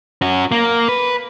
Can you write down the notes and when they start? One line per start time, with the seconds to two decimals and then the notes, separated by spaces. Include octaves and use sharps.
0.22 C#4 F#4
0.51 A#3
0.88 B4